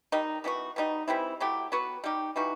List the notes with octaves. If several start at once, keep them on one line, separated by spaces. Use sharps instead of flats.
D#3 G3 D#4
E3 B3 D#4 F#4
B2 G3 D#4
E3 G3 C4 E4
F#3 A3 E4 G4
F#3 B3 F#4 B4
G3 D#4 G4
E3 G3 D#4 F#4